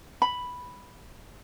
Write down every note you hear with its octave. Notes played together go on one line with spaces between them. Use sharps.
B5